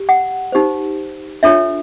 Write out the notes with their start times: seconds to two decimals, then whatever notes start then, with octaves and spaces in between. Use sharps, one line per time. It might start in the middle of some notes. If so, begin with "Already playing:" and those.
Already playing: G4
0.09 F#5
0.52 D#4 G4 C5
1.43 D4 F4 A4 C#5 E5